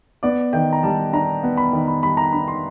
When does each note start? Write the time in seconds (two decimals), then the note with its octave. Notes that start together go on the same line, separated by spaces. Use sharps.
0.23 B3 D5
0.53 D#3 G5
0.73 A#5
0.83 G3 A5
1.13 D4 A#5
1.43 B3
1.57 B5
1.73 D#3
1.88 B5
2.03 G3 B5
2.17 A#5
2.32 D4 B5
2.48 C6